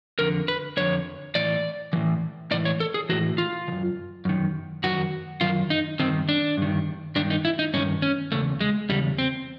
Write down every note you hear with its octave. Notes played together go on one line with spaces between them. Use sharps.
F2 D3 A#4
B4
F2 D3 C#5
A2 E3 D5
A2 E3
A2 E3 D5
C#5
A4
G#4
A2 E3 F#4
F4
D#3
F#2
F#2 D#3
F#2 D#3 F#4
F#2 D#3 F4
D#4
G2 D#3 C4
D4
G2 D#3
G2 D#3 D4
D#4
E4
D#4
G2 D#3 C#4
C#4
E2 C#3 A3
G#3
E2 C#3 G3
C4